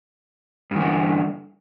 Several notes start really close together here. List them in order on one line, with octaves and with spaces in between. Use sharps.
G2 E3 D3